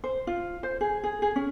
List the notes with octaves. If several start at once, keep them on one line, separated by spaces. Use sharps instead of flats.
C5
F4
C5
G#4
G#4
G#4
C#4